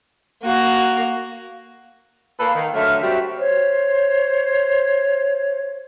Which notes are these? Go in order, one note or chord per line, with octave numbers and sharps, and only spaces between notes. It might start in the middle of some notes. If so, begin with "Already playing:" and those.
A#3 F#4
A#3 A4 B4 F5
D#3
D3 F#3 A3 E5 F6
G3 C4 F#4 E5
C5 C#5